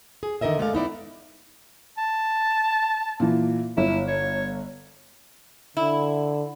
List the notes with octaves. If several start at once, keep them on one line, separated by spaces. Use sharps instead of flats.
G#4
D3 D#3 A#4 D#5 E5
G#3 A3 A4 D5 F5
B3 D#4 E4 D5
A5
A#2 E3
G1 E4
C#5
D3 E4